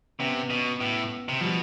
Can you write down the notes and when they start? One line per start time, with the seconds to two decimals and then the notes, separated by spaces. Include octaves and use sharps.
0.20 C3 B3 C#4
0.50 B2
0.81 A2
1.29 C3
1.41 B2 F3 G3